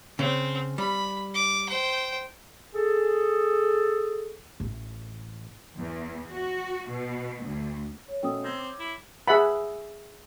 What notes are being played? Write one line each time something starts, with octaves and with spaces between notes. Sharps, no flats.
C#3 C4
G3 B5
D6
C5 G5
G#4 A4
A1
E2
F#4
B2
D2
C#5
B2 A3 C#4 G5 D#6 E6
C4 E6 G#6 A#6
D6
E4
G#4 E5 F#5 B5